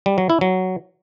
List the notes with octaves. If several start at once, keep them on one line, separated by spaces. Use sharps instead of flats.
G3
F#3
E4
F#3